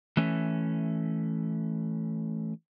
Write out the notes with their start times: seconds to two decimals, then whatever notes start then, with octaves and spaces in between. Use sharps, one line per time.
0.17 E3 A3 C#4